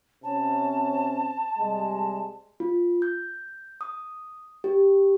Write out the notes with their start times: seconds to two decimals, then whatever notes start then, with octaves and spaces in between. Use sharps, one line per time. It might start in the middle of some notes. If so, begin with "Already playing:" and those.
0.23 C3 C4 C#4 A5
1.58 C3 G3 G#3
2.60 F4
3.02 G6
3.81 D#6
4.64 G4